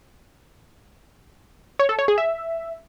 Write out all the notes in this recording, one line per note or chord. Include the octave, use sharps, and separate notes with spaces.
C#5
A4
C#5
G#4
E5